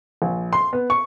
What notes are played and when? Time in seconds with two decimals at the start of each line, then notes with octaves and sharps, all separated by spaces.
0.22 A#1
0.53 C6
0.73 B3
0.90 C#6